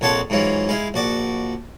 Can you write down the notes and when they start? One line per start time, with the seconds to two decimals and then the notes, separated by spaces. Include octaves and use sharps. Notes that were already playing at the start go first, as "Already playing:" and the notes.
0.01 A#1 F2 C#5 F#5 A5 C6
0.30 G#2 E3 F#3 F4
0.69 G#3 E4 F5
0.94 A#1 F#4 D5